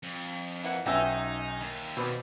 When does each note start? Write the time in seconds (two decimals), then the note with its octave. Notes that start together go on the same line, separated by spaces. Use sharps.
0.03 F2
0.63 E3 A#3 F#5
0.86 B1 B3 C#4 D#4 E5 G5 G#5 E6
1.60 D#2
1.97 B2 C4 B4 D5